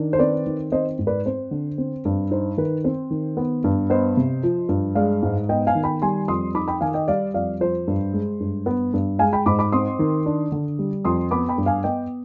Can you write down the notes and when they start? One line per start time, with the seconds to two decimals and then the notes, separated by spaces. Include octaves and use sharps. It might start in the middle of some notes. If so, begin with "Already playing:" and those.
Already playing: D#3 D4
0.13 C5
0.19 C4 B4 D5
0.46 D#3
0.72 C4 C5 D#5
0.99 G#2
1.07 B4 D5
1.26 C4 C5
1.51 D3
1.78 C4
2.05 G2
2.31 D#4 C5
2.58 D#3 B4
2.84 C4 C5
3.10 D#3
3.37 B3
3.64 G2
3.90 B3 C5 D#5
4.17 C3
4.43 F3
4.69 G2
4.95 G#3 D5 F5
5.23 G#2
5.49 B3 D#5 G5
5.67 F5 G#5
5.75 D#3
5.84 G5 B5
6.02 G3 G#5 C6
6.28 F2 C6 D#6
6.54 D#4 B5 D6
6.68 G5 B5
6.81 D#3 F5 G#5
6.94 D#5 G5
7.08 G3 D5 F5
7.34 F2 D5 F5
7.60 F3 C5
7.88 G2
8.13 G#3
8.40 G2
8.66 B3
8.93 G2
9.19 G#3 F5 G#5
9.33 G5 B5
9.46 G#2 B5 D6
9.59 B5 D6
9.72 C4 C6 D#6
9.99 D#3
10.26 D4
10.52 D3
10.79 G3
11.05 F2 C6 D#6
11.31 B3 B5 D6
11.49 G5 B5
11.58 G2
11.66 F5 G#5
11.84 B3 D#5 G5